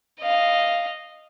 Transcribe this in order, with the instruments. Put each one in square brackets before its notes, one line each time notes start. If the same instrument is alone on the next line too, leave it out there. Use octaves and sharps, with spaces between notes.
[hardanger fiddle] D#5 F5